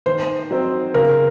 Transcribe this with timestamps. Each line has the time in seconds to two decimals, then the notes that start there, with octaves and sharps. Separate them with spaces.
0.06 D#3 C5
0.51 F#3 C4 D#4
0.94 C#3 A#4